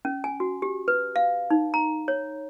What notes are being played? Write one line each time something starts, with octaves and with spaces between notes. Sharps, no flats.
C#4
G#5
F#4
G4
B4
F5
D#4
A#5
C#5